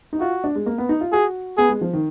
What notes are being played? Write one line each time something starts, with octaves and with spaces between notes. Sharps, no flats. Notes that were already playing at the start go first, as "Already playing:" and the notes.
D#4
F4 F#4
D4
G#3
A#3
B3
D#4
F4
F#4 G#4
B3 G#4
G#3
F3
D#3